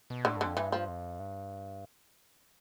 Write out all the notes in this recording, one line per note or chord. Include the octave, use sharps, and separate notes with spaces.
B2
A2 D3
G2 D3
F2
G2 E3
F3
F2
G2